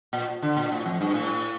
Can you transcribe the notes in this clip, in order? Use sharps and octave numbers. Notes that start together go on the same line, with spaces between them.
A#2
D3
A#2
A2
F2
G2
A2